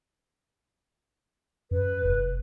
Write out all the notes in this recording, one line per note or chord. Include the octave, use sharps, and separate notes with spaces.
F#2 B4
F1